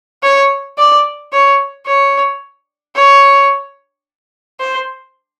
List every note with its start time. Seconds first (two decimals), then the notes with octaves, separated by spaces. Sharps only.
0.23 C#5
0.78 D5
1.33 C#5
1.87 C#5
2.96 C#5
4.60 C5